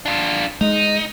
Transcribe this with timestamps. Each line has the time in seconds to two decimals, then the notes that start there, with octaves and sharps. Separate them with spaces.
0.06 D4 F4
0.61 G#3 D#4